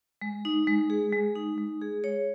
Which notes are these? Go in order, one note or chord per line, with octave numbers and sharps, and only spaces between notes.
G#3
D#4
G#3
G#4
G#3
D#4
G#3
G#4
C#5